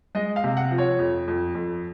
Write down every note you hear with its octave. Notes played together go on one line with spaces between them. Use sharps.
G#3 D#5
F5
C3
F#5
F3
C#5
F2
F2
F2